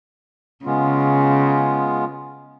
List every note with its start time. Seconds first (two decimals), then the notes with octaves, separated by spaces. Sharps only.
0.65 C#3 G#3 B3 F4